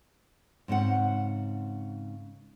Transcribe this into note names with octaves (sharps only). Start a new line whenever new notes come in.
G#2 C#3 C4 F#5